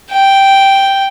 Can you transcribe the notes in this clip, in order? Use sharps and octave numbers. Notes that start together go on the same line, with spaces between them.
G5